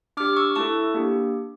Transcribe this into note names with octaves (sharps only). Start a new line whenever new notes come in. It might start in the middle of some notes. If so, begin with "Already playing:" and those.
D4 G4 D6 F6
C#6 E6
A3 E4 A4 A5 C#6
A#3 D4 G4